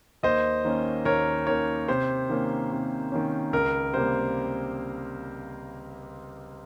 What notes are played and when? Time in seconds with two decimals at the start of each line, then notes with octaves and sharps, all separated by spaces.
0.23 D#2 C5 D#5
0.65 D#3 A#3 C#4
1.05 D#2 A#4 C#5
1.47 D#3 A#3 C#4 A#4 C#5
1.88 C3 C5
2.29 D#3 A#3 C#4
2.71 C3
3.12 D#3 A#3 C#4
3.53 C#2 A#4
3.94 C3 G3 A#3 C5